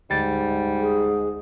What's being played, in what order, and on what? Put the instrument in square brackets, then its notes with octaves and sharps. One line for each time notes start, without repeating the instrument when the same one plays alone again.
[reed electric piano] D2 A6 [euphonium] G#2 [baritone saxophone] G3
[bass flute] G#4